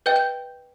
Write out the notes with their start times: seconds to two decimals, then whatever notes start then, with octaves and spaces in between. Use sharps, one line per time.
0.06 B4 D#5 G5 G6
0.16 G6